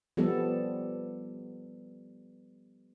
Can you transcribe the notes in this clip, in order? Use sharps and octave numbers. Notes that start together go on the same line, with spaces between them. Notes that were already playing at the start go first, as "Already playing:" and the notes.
F3 G3 B3 A4